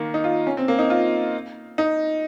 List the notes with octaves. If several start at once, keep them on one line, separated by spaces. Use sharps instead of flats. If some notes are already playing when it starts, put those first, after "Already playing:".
Already playing: D#3 A#3
D#4
F4
C#4
C4
A#3
D#4
F4
D#4